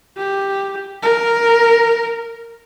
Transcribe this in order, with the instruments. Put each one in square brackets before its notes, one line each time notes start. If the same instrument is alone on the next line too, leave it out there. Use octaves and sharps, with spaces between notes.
[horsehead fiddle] G4
A#4